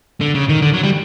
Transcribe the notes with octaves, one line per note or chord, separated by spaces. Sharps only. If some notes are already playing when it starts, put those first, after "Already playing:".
D3
C#3
D#3
D3
F#3
G3